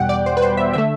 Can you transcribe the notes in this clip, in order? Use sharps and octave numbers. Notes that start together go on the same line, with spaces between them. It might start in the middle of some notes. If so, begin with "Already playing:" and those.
Already playing: E2 B2 G3 F#5 G5
D5
C5
B4
C5
E5
D3 A3 E5